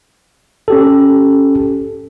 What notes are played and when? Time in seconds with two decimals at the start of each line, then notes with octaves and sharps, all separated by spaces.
0.68 C#4 G4 A4